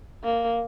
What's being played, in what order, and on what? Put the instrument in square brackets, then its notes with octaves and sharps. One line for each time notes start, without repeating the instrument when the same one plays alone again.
[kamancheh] A#3